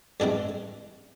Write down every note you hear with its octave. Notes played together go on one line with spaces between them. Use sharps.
G2 E3 G#3 C4 E4